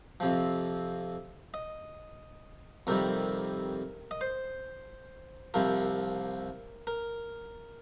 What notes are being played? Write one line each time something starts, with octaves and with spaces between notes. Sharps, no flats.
F2 C3 F3
D#5
F2 C3 D#3 G3 A#4
D#5
C5
C2 C3 F3 A#4
A#4